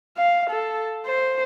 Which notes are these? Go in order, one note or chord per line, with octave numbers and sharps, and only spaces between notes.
F5
A4
C5